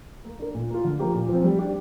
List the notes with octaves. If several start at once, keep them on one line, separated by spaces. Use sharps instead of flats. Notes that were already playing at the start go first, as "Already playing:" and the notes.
A#3
D4 A#4
A#2
A#3 F4
D3
F3 A#3 G4
A#2
F3 C4
G3
D4 G4